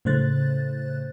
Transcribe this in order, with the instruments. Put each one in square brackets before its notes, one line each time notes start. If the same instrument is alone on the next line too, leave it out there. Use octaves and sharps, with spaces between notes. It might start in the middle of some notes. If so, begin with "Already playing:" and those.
[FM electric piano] A2 C#3 A3 C5 F#6 A6